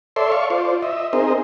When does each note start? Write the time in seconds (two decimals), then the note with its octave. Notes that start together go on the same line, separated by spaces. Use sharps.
0.16 A4 C#5 D5 E5 C6
0.32 D5 F5 C#6
0.50 F4 C5 D5
0.82 D#5 E5
1.13 C4 D#4 G#4 A#4 C5 D#5